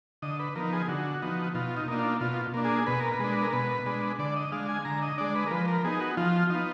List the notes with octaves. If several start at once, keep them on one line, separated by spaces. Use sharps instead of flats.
D3 D#5
B4
F3 B3 D#4 A#4
G#4
D3 F#4
F3 B3 D#4
B2 F4
D#4
A#3 D4 D#4
F4
B2 F4
A#3 D4
G#4
B2 B4
A#4
B4
G#3 D4
A#4
B2 B4
G#3 D4
D3 D5
D#5
G#3 D4 F5
G#5
D3 A#5
D#5
G#3 D4 D5
B4
A#4
F3 B4
A#4
B3 D#4 G#4
F#4
F3 F4
B3 D#4 F4